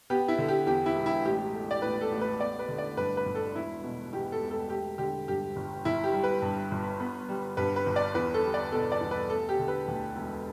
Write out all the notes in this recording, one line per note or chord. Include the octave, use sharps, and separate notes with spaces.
B3 G4
E4
D3
G4
E2 G4
E4
E1
E4
A1 G4
A3
D5
A2 B4
A4
A1
B4
B3 D5
B4
D3
D5
G2 B4
B4
G1
A4
E1 E4
B2
E2 G4
A4
E1
A4
A3 G4
D3 G4
G2 G4
G1
G1 E4
G4
G3
B4
G2
G1
B3
G3
G2 B4
B4
G1
D5
E2 B4
A4
G3
D5
B2 A4
D5
E2
B4
A3 A4
G4
D3
B4
D2
E1